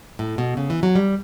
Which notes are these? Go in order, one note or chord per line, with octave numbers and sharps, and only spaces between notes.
A2
B2
C#3
E3
F#3
G3